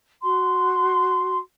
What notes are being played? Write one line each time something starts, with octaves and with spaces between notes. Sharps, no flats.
F#4 C6